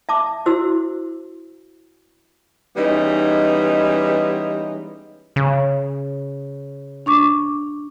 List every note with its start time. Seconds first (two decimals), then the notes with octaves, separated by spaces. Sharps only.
0.09 E5 A5 D6
0.46 E4 F#4 C5 E6
2.76 E3 G3 G#3 B3 C#4 D#4
5.36 C#3
7.06 D4 C#6 D6